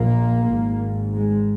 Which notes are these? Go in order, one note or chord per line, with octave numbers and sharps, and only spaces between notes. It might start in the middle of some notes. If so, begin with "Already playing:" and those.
Already playing: A#1 A#2 A#3
G#1 G#2
G#3